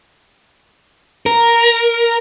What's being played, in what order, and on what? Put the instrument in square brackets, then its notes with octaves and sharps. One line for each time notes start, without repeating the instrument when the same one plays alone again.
[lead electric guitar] A#4